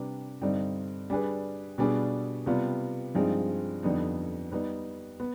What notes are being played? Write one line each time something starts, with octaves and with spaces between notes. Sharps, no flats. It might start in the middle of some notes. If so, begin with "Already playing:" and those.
Already playing: C3 G3 D4 G4 B4
G2 D3 G3 C4 D#4
G3 D4 G#4 B4
B2 G3 B3 D4 G#4
C3 G3 B3 F4
G2 F3 G#3 C4 D#4
F2 D3 G3 B3 D#4
G3 B3 D#4 B4
B3